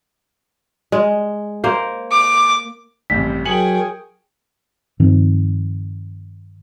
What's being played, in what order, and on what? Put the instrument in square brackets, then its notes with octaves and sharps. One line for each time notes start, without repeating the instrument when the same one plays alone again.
[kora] G#3
A#3 C5
[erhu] D6
[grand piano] A1 G2 C3 [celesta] B6
[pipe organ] F#3 F#4 A#4 [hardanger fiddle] G#4 G5 [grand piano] G#5 C#7 F#7
[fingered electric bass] G2 D#3 F3 C4